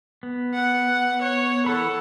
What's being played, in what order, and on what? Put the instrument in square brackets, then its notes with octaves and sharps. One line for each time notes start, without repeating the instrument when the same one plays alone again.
[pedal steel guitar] B3
[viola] F#5
C#5
[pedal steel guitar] E3 B5 [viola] A4 F#5